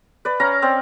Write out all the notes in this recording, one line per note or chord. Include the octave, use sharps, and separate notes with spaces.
B4 D5
C#4 F5 A#5
C4 C5 D5